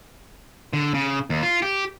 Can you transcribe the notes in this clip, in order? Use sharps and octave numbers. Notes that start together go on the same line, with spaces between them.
D3
C#3
D#2
F4
G4